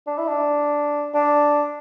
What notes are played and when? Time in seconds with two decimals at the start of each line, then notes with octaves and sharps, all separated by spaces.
0.07 D4
0.18 E4
0.28 D4
1.14 D4